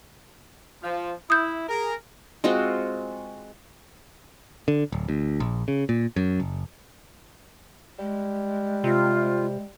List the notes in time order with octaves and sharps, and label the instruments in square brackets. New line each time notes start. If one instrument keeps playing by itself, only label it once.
[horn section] F3
[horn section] E4 [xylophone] D#6 G6
[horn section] G#4 A#4
[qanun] G#3 C4 F4 F#4
[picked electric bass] D3
D1
D2
A#1
C#3
A#2
F#2
F#1
[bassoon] G3 [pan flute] G#3
[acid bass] C3 [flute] F4